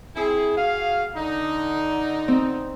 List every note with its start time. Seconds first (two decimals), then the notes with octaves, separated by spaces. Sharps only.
0.16 C4 E4 G#4
0.56 F#4 G#4 F5
1.15 D3 D#4
2.28 C4